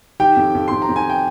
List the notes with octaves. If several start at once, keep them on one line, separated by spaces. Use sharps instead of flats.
D#3 G4 G5
F2
F2
F2 C6
A#5
F2
G#5
G5